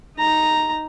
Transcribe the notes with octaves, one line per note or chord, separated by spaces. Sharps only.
D#4 A#5